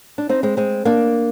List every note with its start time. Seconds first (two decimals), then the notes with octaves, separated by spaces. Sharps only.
0.18 D4
0.29 C4 D#4
0.43 G#3 C4
0.57 G#3 C4
0.85 A#3 D4